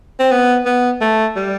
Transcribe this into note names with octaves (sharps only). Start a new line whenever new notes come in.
C4
B3
B3
A3
G3